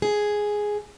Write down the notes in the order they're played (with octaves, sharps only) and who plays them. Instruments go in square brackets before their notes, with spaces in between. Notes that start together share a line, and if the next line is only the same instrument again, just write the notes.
[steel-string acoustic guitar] G#4